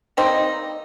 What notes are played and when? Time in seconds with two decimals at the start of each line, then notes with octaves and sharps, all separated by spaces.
0.17 D#3 G3 A#3 C4 D#4